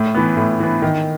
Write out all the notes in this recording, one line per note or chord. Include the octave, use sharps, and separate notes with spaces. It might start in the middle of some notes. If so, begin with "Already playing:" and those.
Already playing: A2
E3 B3
A2
E3 B3
D#3